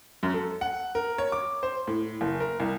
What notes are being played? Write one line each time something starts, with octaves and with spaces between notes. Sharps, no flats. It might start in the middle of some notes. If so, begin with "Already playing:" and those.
F#2
A4
F#5
A#4
C#5
D6
C5
A2
F#1
A#4
C2